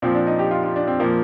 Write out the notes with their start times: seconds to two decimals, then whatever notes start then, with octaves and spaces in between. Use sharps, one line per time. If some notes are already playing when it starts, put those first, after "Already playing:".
0.02 A#2 F3 C4
0.15 D4
0.27 D#4
0.39 G4
0.51 F4
0.64 F4
0.76 D4
0.88 C4
1.00 A#2 F3 A#3